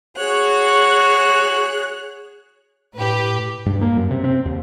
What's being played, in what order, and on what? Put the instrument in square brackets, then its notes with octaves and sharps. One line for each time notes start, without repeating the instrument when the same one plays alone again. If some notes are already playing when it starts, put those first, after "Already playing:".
[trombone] F#4 [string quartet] G#4 C#5 F#6
[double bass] A2 [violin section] G4 B4
[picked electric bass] G2
A#3
F#2
C3
C4
D#2